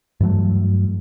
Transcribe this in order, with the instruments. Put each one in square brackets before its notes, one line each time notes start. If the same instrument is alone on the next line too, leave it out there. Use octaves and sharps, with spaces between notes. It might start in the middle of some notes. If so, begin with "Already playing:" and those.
[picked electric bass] G2 E3 F#3 A3